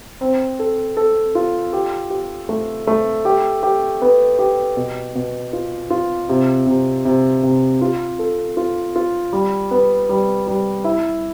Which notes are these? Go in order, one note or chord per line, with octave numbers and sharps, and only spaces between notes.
C4
A4
A4
F4
G4
G4
A3
A3
G4
G4
B3
G4
B2
B2
F4
F4
C3
C3
C3
C3
F4
A4
F4
F4
G3
B3
G3
G3
E4